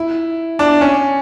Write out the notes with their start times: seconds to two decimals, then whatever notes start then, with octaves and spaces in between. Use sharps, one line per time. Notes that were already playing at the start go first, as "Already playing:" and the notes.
Already playing: E4
0.59 D4
0.81 C#4